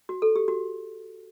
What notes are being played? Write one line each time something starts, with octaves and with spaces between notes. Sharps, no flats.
F#4
A4
G4
F#4